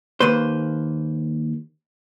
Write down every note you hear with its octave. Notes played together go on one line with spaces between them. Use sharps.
D#2 A#3 B4 C5